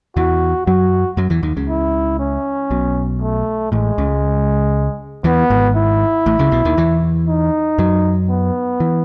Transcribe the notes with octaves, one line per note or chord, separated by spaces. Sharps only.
E2 E3 F#4
F#2 F#3 F#4
F#2 F#3
E2 E3
D#2 D#3
C#2 C#3
E4
C#4
B1 B2
A3
A1 A2 G#3
C#2 C#3
E2 E3 B3
G#1 G#2
E4
A1 A2
C#2 C#3
B1 B2
D#2 D#3
E2 E3
D#4
F#2 F#3
B3
E3